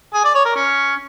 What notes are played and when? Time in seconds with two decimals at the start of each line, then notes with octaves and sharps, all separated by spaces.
0.14 G#4
0.24 D5
0.35 C#5
0.45 A#4
0.56 C#4